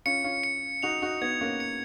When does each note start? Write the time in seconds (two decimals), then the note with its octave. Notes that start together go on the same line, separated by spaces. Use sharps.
0.05 C#4 F4 C#7
0.24 C#4 F4
0.44 C#7
0.82 D#4 F#4 F7
1.02 D#4 F#4
1.21 B3 D#4 G#6
1.41 A#3 C#4
1.60 C#7